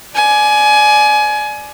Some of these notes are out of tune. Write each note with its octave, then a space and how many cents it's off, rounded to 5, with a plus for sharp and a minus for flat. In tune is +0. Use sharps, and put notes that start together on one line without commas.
D5 +10 G#5 +25